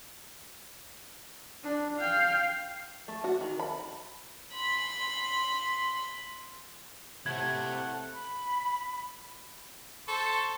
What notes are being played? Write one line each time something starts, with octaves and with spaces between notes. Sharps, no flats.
D4
F5 G5
A3
F#4
D#3
B5
B5 C6
C3 A3 E4 C#5 F#5 G#6
B5
A4 C5 C#6